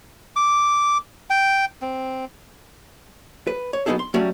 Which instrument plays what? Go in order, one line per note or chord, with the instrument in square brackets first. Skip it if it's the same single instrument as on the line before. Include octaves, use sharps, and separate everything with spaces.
[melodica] D6
G5
C4
[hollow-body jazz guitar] B4
C#5
F#3 B3 C4 D#4 G#4 A4
C6
F#3 G3 A3 C#4